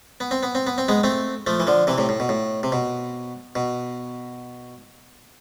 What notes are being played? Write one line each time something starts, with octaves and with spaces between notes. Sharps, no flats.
B3
C4
B3
C4
B3
C4
G#3 B3
A3 C4
F3 A3
E3
D3 F3
C3 E3
A2 C3
A2
B2
A2
C3
B2
B2